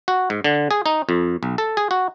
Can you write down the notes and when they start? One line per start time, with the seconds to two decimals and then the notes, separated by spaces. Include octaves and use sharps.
0.08 F#4
0.30 G#2
0.44 D3
0.71 G#4
0.86 D#4
1.09 F2
1.43 B1
1.58 A4
1.77 G#4
1.91 F#4